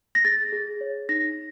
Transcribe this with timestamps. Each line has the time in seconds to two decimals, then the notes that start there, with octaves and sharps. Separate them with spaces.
0.15 A#6
0.25 G#4 A6
0.53 G#4
0.81 C#5
1.09 D#4 A#6